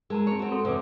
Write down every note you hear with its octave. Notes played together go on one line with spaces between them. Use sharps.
G#3 A#4 A5 A#5
C4 C#5
C4 F#4
A4 C#5 C6
E2 C3 C4 D6 D#6